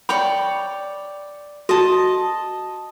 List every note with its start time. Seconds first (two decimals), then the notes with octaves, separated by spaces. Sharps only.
0.09 C#5 D5 G5 B5
1.69 F#4 D#5 A5